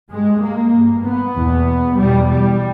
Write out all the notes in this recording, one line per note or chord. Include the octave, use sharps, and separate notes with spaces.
G2 G#3
A#3
G2
B3
E2 B2
E2 B2 G3
G3